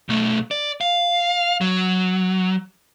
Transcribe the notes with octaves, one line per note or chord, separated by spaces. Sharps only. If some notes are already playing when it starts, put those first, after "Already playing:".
B1 A3
D5
F5
F#3